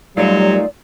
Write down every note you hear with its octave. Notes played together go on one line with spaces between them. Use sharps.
F#2 A#2 F#3 G3 A3 D#4 F4 D5